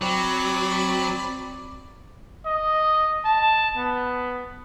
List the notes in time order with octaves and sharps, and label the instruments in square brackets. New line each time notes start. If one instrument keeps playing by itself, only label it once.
[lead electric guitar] F#3 [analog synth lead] C4 [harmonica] D5 B5
[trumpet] D#5
A5
B3